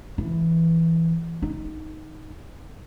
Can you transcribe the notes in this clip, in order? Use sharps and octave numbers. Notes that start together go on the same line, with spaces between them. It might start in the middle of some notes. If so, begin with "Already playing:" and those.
E3
D#4